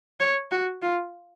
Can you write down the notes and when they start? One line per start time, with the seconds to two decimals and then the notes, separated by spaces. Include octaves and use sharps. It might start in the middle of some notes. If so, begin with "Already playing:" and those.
0.20 C#5
0.51 F#4
0.82 F4